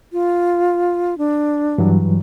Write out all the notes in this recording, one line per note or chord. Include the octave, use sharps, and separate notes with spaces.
F4
D4
G2 E3 F#3